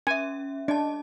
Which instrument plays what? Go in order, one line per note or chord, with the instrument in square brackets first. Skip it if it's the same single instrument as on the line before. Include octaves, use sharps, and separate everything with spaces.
[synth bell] C#4 E5 [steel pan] G#5
[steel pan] D4 [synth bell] D#5 A5